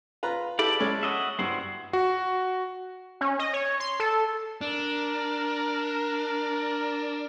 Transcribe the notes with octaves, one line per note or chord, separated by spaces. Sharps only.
F4 B4 A#5
E4 G4 A4 D5 B5 D6
G#3 C#4 A4
F#4 D#5 E5
G2 E4 F#4 C5
F#4
C#4
D#5
C#5
C6
A4
D4 A#4